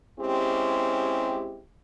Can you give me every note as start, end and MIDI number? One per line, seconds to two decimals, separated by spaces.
0.19 1.61 56
0.19 1.61 60
0.19 1.61 61
0.19 1.61 64
0.19 1.61 67